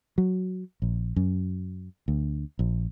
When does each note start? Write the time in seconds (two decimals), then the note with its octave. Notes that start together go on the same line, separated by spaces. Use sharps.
0.18 F#3
0.82 A#1
1.16 F#2
2.08 D2
2.59 A#1